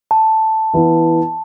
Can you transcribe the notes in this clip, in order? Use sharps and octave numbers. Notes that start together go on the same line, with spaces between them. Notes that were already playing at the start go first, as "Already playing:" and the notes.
A5
E3 B3 E4